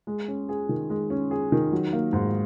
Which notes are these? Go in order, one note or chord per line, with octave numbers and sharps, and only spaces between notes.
G#3
C#4
G#4
D#3
G#3
C#4
G#4
D#3
F#3
A#3
G#2